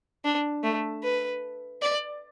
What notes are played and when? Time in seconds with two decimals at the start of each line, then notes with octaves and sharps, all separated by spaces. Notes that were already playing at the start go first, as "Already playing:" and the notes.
0.25 D4
0.63 A3
1.04 B4
1.82 D5